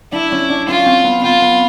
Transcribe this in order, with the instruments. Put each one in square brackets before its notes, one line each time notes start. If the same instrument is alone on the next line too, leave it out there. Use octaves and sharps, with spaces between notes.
[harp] D4 [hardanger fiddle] E4
[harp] C#4
D4
[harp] C#4 [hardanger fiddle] F4
[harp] C4
B3
[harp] C4 [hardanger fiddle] F4
[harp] B3